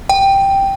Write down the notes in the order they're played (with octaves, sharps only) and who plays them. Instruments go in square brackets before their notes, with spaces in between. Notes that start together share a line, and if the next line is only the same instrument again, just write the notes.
[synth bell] G5